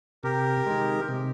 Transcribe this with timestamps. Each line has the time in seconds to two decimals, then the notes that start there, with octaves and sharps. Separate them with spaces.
0.23 C3 G4 A#4
0.66 D#3 G#3
1.08 C3